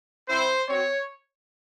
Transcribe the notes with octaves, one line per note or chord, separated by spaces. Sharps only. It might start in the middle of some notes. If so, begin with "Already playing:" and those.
C4 E4 C5
C4 F#4 C#5